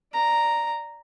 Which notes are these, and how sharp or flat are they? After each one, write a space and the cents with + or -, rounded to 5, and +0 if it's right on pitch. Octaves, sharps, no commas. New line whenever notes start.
D5 +0 A#5 +0